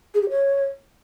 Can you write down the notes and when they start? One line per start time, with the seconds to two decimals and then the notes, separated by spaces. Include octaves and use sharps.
0.14 G#4
0.22 G4
0.29 C#5